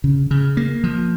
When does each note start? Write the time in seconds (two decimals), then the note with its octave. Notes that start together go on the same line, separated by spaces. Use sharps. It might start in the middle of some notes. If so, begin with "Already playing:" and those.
0.04 C#3
0.31 C#3
0.57 A#3
0.84 F3